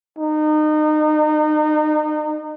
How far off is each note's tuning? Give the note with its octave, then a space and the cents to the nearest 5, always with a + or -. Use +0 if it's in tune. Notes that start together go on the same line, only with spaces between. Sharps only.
D#4 -30